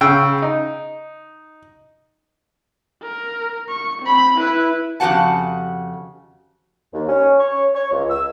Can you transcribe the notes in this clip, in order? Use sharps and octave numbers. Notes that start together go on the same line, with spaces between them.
C#3 G5 E6
D#4
A#4
C#6
C4 B5
E4 B4
F2 C#3 F#4 G4 F#5 A5
D#2
C#4
C#5
C#5
C#2
E6